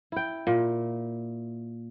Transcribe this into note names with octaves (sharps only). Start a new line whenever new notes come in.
E4 G5
A#2